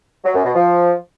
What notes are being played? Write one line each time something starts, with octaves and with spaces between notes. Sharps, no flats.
F#3
F#2
B2
F3